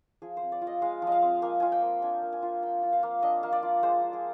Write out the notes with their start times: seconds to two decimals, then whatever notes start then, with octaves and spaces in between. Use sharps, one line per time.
0.22 F3 G#4
0.37 C4 C5
0.52 D5
0.62 F4
0.67 D#5
0.82 G#3 F5
1.02 F3
1.07 D#5 F5
1.22 C4
1.42 A#3 G#5
1.60 F4 G#5
1.72 G5
1.82 A#3
2.02 D4 G#5
2.22 A#3
2.32 G#5
2.42 F4
2.62 A#3 G5
2.83 F4
2.93 F5
3.03 A#3
3.22 D4 D#5
3.43 A#3
3.52 D5
3.63 F4
3.83 G#3 C5
4.03 F4
4.13 G#4